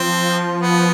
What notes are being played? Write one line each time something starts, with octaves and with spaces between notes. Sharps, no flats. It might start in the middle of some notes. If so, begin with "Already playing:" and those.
Already playing: F3 C4
F3 B3